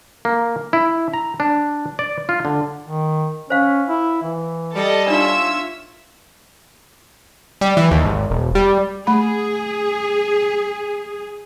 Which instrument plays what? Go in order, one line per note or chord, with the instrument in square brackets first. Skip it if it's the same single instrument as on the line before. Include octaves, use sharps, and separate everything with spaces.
[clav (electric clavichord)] A#3
E4
A#5
D4
D5
F4
D3
[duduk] D#3
[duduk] C#4 [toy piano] C5 F5
[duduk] E4
E3
[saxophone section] G3 [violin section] A4 D#5 A5
[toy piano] D4 D#4 A5 [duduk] F4 [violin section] C#5 E5 E6
[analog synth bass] G3
E3
D#2
G#1
E1
G3
[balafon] A3 B5 [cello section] G#4